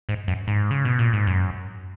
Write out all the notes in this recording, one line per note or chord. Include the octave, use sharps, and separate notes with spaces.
G#2
F#2
G#2
C#3
B2
A#2
G#2
F#2